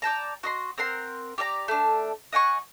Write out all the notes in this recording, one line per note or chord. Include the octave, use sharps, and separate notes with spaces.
D5 G5 A5 A#5
F#4 D#5 C6
C4 A#4 F#5 C6
G4 D5 E5 A#5
A3 D4
D#5 F#5 G#5 C#6